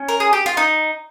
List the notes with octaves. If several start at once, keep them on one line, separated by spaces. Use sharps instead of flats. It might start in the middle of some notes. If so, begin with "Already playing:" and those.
Already playing: C#4
A#4
G#4
G4
F4
D#4